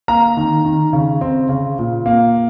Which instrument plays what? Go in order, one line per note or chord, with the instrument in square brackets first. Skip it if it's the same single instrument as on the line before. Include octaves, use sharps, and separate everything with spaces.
[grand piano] A#3 A#5
D#3
D#3
C#3
C4
C#3
A#2
A#3